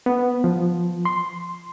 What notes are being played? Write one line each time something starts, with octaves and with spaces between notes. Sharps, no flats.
B3
F3
C6